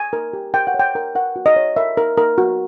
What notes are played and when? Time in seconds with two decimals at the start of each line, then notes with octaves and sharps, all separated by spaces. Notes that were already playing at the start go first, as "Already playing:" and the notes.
Already playing: G#5
0.13 A#4
0.33 G4
0.54 A#4 G5
0.67 F#5
0.74 C#5
0.80 G5
0.95 A#4
1.15 A#4 F#5
1.36 F#4
1.46 D#5
1.56 C#5
1.77 A#4 E5
1.97 A#4
2.17 A#4
2.38 F#4